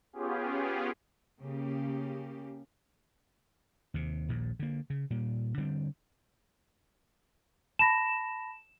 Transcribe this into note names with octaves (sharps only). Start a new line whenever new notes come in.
B3 C#4 F4 G4 G#4
C#3 A#3 G4
D#2 C3
A#1 D#2 A#2
D3 A#3
C#3
A#2 G3
D3 G3 C4
A5 B5 A#6 E7